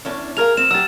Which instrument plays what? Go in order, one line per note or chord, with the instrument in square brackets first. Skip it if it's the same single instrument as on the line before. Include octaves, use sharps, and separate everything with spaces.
[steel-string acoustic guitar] E2 C#4 D4
[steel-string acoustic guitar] G#4 A#4 F5 [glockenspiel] F6 F7
[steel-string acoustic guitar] C4 [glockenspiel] E7
[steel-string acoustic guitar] F#3 G4 [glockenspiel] E6 A6